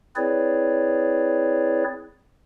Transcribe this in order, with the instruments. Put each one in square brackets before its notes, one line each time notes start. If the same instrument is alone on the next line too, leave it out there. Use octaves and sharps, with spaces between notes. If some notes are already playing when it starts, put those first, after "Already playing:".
[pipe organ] C4 E4 G#4 B4 C#5 D5